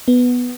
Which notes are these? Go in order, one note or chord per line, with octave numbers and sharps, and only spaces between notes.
B3